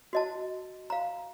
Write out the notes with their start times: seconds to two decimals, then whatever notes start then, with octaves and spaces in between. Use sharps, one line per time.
0.13 F#4 D#5 A5
0.90 F5 A#5